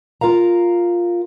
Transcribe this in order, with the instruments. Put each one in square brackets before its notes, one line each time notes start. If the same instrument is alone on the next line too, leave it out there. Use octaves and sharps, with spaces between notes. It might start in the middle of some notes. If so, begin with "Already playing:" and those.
[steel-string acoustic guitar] F4 A#4 F5 A#5